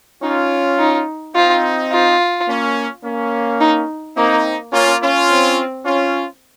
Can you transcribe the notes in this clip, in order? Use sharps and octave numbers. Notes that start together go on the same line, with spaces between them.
C#4 D#4 F4
D#4
C4 D#4 F4
F4
A#3 C#4
A#3 C#4
D#4
A#3 C4 D#4
A#3 C#4 F4
C#4 F4
C4
C#4 F4